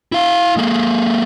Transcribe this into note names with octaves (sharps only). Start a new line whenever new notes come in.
E4 F5
G#3 A#3